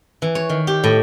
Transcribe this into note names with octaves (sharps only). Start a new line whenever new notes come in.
E3
C#5
D#3
G4
A2